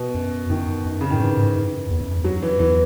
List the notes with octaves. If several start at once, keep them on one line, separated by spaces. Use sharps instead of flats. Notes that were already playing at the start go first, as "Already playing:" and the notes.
Already playing: B2
F#2
F#2 D#3
F#2
C#3
A2 D#3
G#2 E3
G#2
F#2
E2
F#2
E2
F#2 F#3
E3
E2 E3